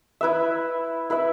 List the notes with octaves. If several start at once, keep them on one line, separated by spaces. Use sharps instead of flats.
E4 B4 E5
E4 B4 E5